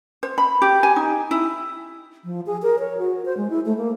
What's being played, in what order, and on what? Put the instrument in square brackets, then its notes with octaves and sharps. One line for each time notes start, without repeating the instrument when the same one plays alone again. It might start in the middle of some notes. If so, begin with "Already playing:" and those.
[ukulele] C5
B5
G4
G#5
D#4
E4
[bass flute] F3
G#4
A#4
C#5
F#4
C5
G#3
E4
A3
A#3